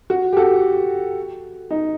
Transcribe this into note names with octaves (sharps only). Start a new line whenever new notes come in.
F#4
G4
F#4 A4
D#4